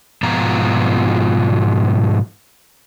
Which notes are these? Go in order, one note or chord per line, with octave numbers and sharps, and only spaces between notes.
G#2 B2 F3 B3 F4 A#5